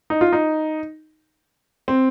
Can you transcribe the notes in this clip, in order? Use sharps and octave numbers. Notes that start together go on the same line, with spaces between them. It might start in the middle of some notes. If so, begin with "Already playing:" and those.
D#4
F4
D#4
C4